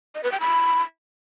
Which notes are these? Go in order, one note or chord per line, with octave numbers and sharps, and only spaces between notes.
D#5
B4
G5
B5